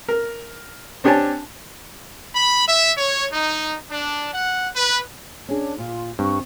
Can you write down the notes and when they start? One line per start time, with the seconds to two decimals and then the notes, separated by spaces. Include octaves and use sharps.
0.09 A#4
1.04 C4 D4 G4 C#5 G#5 A5
2.35 B5
2.67 E5
2.98 C#5
3.33 D#4
3.89 D4
4.32 F#5
4.76 B4
5.49 C#4 D4 G#4
5.78 A#2 F4
6.19 G2 C4 C#6